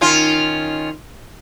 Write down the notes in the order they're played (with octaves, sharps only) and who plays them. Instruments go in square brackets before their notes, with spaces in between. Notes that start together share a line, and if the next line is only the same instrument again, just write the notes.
[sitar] D#3 C#4 F4